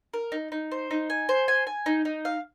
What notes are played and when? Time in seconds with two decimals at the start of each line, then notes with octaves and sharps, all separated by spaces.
0.14 A#4
0.32 D#4
0.52 D#4
0.72 C5
0.91 D#4
1.10 G#5
1.29 C5
1.48 G#5
1.67 G#5
1.86 D#4
2.05 D#4
2.25 F5